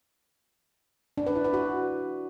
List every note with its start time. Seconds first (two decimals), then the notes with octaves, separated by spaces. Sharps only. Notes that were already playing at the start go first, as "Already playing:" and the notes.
1.18 D4
1.27 B4
1.36 E4
1.44 B4
1.53 F#4